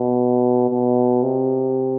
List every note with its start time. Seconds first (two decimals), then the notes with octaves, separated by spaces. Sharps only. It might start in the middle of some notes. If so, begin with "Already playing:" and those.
Already playing: B2
0.69 B2
1.23 C3